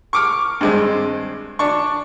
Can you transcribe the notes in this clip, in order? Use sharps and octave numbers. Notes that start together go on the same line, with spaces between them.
C#6 D6 F6
G2 G#3 C4
D4 C#6